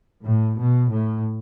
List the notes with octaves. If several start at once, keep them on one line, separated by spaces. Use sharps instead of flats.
A2
B2
A2